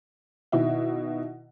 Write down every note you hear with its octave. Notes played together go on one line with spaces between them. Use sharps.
B2 D#3 E4